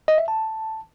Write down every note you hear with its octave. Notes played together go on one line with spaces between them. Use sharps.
D#5
E5
A5